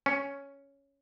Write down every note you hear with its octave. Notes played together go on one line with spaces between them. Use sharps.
C#4